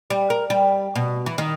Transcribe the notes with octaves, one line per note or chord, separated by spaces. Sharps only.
G3
A#4
G3
B2
E3
D#3